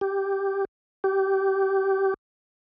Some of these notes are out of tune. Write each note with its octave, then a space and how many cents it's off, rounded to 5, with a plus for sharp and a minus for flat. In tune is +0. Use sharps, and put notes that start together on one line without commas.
G4 +0
G4 -20